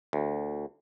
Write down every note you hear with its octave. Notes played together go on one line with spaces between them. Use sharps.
D2